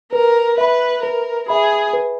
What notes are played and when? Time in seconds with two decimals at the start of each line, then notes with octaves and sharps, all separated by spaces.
0.12 A#4 B4
0.58 B4 E5 B5
1.03 A#4 B4
1.48 G#4 E5 B5
1.93 B4